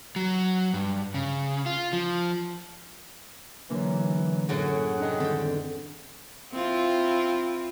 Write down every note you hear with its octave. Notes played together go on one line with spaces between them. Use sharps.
F#3
G2
C#3
F4
F3
B1 D3 E3 F#3 A#3
F#2 A2 F#3 G#4 F#5
D4 D#5 G5
F#2 D3 D#3 C4 G5
C4 E4 F4